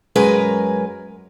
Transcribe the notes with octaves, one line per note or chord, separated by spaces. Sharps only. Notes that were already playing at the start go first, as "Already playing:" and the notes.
F#2 G#3 A#4 B4 G#5